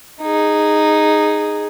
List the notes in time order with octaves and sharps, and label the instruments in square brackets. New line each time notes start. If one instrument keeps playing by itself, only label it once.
[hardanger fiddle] D#4 G#4